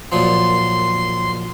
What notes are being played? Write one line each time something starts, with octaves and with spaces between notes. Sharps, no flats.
F#2 A#2 F3 C6